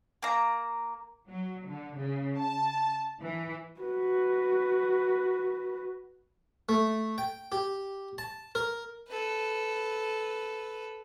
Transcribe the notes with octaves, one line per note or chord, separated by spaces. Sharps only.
A#3 A#5
F#3
D3
C#3
A5
E3
F#4 B4
A3
G5
G4
A5
A#4
A4 B4